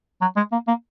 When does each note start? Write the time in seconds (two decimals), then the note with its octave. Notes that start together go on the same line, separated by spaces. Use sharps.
0.21 F#3
0.36 G#3
0.52 A#3
0.68 A#3